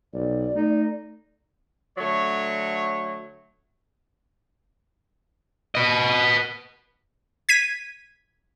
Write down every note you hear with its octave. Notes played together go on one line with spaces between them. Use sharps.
B1 D5
A3 D#4
D3 F#3 A3 C#5
B4 D#5
G#6 B6 D#7